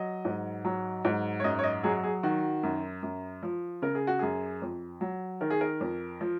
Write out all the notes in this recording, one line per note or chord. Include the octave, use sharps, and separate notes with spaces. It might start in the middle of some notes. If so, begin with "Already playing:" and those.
Already playing: F#3 D#5
G#2
F#3
G#2
C#5
F#2 D#5
C#5
D#5
F#3 G#4
G#4
D#3 F#4
F#2
F#2
F3
C#3 A#4
G#4
F#4
F#2 G#4
F2
F#3
D#3 A#4
G#4
A#4
F2
F3